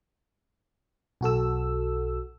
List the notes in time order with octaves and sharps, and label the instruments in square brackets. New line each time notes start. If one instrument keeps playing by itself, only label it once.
[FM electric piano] B1 F#4 A4 E6